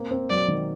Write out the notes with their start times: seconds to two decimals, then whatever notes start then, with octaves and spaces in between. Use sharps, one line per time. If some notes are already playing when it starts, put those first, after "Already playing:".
Already playing: A#3 C4
0.11 C4
0.30 F#3 D5
0.48 D#3